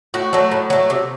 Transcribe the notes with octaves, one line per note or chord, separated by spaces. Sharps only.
A2 F#4
F#3 A3
A2
F#3 A3
C3